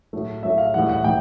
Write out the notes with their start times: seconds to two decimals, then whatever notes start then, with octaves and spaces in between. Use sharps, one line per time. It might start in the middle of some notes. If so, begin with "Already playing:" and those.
0.13 A2 F#3 A3
0.43 A2 F#3 A3 E5
0.58 F5
0.74 A2 E3 G3 F#5
0.89 F#5
1.04 A2 E3 G5